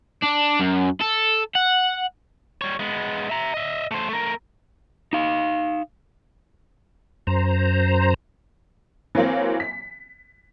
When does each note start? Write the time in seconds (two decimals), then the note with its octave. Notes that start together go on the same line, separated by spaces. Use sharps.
0.22 D4
0.60 F#2
1.01 A4
1.55 F#5
2.62 G3 C#5
2.80 G#3 B3
3.30 E5 A#5
3.54 D#5 E5
3.91 A3 C5
4.09 A3 A#4
5.13 D#4 F5
7.27 F#2 C5 A#5
9.15 E3 F#3 A#3 C4
9.60 B6